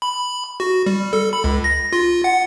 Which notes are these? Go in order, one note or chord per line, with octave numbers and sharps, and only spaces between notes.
B5
F#4
G3
A4
B5
C#2
A#6
F4
F#5